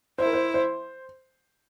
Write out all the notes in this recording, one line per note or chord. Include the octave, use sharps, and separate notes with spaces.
E4 C5
A#4
C5
C5